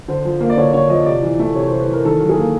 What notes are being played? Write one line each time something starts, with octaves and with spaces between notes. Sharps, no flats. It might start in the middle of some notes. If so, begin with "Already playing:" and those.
D3 C5
F3
A#3
D5
D3 C#5
D3 C#5
F3 D#5
C3 D5
E3
A3
C3 C#5
C3 C5
B4
E3
A#4
D#3 A4
F#3
G#4
A#3